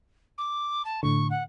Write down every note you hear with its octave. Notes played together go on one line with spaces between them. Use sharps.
D6
A5
A2 D3 C#6
F#5